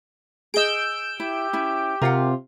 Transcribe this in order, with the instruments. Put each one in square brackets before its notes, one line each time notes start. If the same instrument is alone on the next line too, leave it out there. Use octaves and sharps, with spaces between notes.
[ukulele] G#4 D#5 [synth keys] E6 G6 D7
[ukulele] E4 [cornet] G4
[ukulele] C#4 E4
[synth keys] C3 F4 [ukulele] A#4 F#5